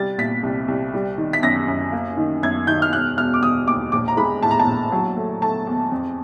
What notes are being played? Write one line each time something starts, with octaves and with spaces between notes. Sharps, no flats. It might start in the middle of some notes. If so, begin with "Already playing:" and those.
Already playing: C3 G3 A6
A#2 B6
C2
C2
G3
D#3
B6
F#2 A#6
F#2
A#3
D#3
F#2 G#6
D#3 G6
F6
E1 F#6
E1 F6
D6
E1 D#6
D#2 D6
A#1 D6
A#5
G#3 B5
A2 A5
A#5
A5
A#1
F#3
A3
A3 A5
E2
F2